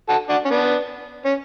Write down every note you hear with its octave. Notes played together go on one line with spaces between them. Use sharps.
F#4 A4
D4 F#4
C#4
B3 D4
C#4